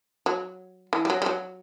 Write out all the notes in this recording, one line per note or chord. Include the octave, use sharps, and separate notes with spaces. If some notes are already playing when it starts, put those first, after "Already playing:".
F#3
E3
G3
F#3
G3
F#3